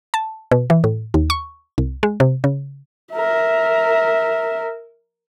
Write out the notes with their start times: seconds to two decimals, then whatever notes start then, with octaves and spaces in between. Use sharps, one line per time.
0.14 A5
0.51 B2
0.70 E3
0.84 A2
1.14 D#2
1.30 C#6
1.78 C2
2.03 G#3
2.20 C3
2.44 C#3
3.13 A#4 E5